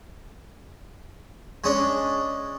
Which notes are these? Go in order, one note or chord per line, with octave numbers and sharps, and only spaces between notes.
G#3 C#4 D4